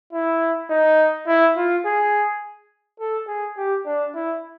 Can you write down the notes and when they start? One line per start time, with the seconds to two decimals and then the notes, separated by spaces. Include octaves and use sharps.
0.13 E4
0.70 D#4
1.27 E4
1.56 F4
1.85 G#4
3.00 A4
3.28 G#4
3.57 G4
3.86 D4
4.14 E4